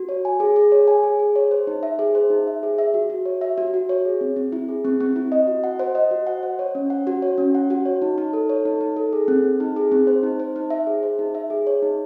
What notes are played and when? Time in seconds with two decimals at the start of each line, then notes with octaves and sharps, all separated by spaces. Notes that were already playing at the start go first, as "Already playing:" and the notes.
Already playing: F#4
0.09 C#5
0.25 G#5
0.40 G#4
0.56 G#4
0.72 C#5
0.88 G#5
1.03 G#4
1.19 G#4
1.36 C#5
1.51 C5
1.67 D#4
1.83 E5
1.99 G#4
2.15 C5
2.30 D#4
2.47 E5
2.63 G#4
2.78 E5
2.94 F#4
3.10 F#4
3.26 C#5
3.41 E5
3.58 F#4
3.74 F#4
3.89 C#5
4.05 G#4
4.21 C4
4.36 C4
4.52 E4
4.69 G#4
4.85 C4
5.00 C4
5.16 E4
5.32 D#5
5.47 F#4
5.64 F#5
5.79 C5
5.95 D#5
6.11 F#4
6.27 F#5
6.43 C5
6.59 C#5
6.75 C#4
6.90 F#5
7.07 F#4
7.22 C#5
7.38 C#4
7.55 F#5
7.70 F#4
7.85 C#5
8.02 D#4
8.18 D#4
8.33 A4
8.49 C#5
8.65 D#4
8.81 D#4
8.96 A4
9.13 G#4
9.28 C4
9.44 C5
9.60 D#4
9.76 G#4
9.92 C4
10.07 C5
10.23 D#4
10.40 C5
10.56 D#4
10.70 E5
10.87 G#4
11.03 C5
11.19 D#4
11.35 E5
11.50 G#4
11.67 C#5
11.82 D#4